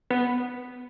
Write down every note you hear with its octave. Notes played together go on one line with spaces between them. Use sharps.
B3